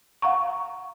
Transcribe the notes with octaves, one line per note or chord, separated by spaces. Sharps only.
F5 F#5 A#5 C#6